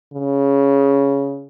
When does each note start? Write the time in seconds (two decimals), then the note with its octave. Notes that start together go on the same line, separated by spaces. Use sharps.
0.13 C#3